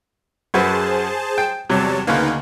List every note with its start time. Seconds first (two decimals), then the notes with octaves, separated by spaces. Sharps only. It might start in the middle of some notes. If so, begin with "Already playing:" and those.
0.54 F#2 F#4 G#4 B4 C5 A5
1.38 G5
1.70 E2 C3 F#3 G3 C#5 A5
2.07 D2 C#3 A#3 D#4 B4